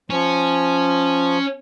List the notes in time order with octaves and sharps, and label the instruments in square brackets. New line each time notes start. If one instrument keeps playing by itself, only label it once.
[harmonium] F3 [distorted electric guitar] C#4